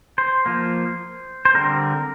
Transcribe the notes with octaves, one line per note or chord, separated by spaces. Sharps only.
C5
F3 A#3
C5
D3 G3 C4 A#4